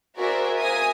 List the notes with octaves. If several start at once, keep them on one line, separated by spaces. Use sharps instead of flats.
F#4 G#4 A#4 C5 D5 E5
E5 F5 G#5 A#5 D#6